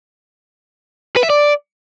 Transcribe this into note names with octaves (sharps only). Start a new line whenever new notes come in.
B4
E5
D5